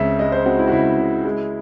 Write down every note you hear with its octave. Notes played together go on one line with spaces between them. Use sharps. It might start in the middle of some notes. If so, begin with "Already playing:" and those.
Already playing: C#2 C#3 C4 E5
G#3 D#5
C5
C4 F#4
E4
F#4
C#2 E4
C#3
G#3 E4